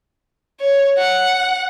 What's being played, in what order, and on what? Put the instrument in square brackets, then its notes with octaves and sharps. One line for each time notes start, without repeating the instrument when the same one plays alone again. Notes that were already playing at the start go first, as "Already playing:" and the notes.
[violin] C#5
F#5